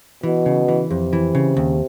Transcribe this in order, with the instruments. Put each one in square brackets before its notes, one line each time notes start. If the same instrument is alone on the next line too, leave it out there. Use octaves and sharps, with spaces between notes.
[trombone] B2 [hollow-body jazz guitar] E3
[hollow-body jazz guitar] C#3
E3
[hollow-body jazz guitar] F2 [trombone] C3
[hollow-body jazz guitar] E3
C#3
D#2